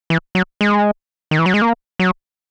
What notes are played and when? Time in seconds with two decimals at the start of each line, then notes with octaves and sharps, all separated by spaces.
0.10 E3
0.35 F#3
0.61 G#3
1.31 D#3
1.39 E3
1.46 F#3
1.54 G#3
1.62 A#3
1.99 F#3